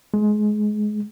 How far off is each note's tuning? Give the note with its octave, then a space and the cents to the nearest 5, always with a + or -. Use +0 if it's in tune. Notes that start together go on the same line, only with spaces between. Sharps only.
G#3 +25